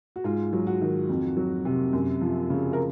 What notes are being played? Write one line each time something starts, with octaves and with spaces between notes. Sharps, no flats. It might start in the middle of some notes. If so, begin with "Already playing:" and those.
F#4
G#2 F4
F#3
F#4
D#3
F2
F#3
C3
F#2
F3
C#3
A#4